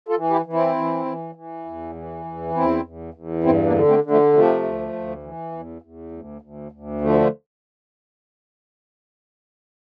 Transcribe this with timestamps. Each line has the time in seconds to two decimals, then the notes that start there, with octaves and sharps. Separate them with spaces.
0.08 F4 A4
0.16 E3
0.30 E4 G4
0.46 E3
0.53 C4 E4
0.76 E3
1.05 E3
1.35 E3
1.65 E2
1.95 E3
2.25 E2
2.54 E2 C4 E4
2.84 E2
3.14 E2
3.44 G2 C4 E4
3.66 A#3 D4
3.73 D3
3.88 A3 C4
4.04 D3
4.10 F3 A3
4.33 C3 F3 A3
4.63 D2
4.93 D2
5.23 E3
5.52 E2
5.82 E2
6.11 D2
6.41 D2
6.72 D2
7.01 D3 F3 A3